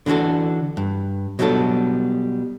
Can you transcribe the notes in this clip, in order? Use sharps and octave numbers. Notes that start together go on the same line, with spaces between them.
D3 E3 D4 F#4 A4
G2
B2 F#3 G3 D4 A4